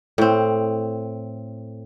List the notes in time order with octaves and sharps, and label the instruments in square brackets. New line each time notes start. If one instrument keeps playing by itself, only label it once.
[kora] A2 C4